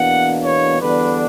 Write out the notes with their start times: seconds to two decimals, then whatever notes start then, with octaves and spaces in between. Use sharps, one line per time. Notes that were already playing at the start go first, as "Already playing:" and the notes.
Already playing: E2 B2 A#3 D4 F#5
0.43 C#5
0.80 E2 D3 G3 B3 D4 B4